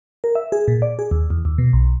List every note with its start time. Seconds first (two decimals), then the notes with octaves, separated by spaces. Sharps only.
0.24 A#4
0.35 E5
0.52 G#4
0.68 A#2
0.82 D5
0.99 G#4
1.11 D#2
1.30 E2
1.45 D#2
1.58 B2
1.73 B1